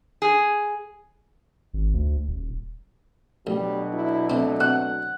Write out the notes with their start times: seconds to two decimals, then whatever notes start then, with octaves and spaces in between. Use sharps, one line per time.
0.22 G#4
1.74 G#1
1.94 D2
2.28 D#1
3.47 A1 B2 D3 F#3 G3
3.93 E4
4.30 E3 A3 C4
4.60 C4 F#5